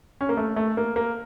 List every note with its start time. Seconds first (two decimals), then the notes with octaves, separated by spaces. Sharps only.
0.21 C#4
0.29 A#3
0.37 A3
0.56 A3
0.77 A#3
0.96 A#3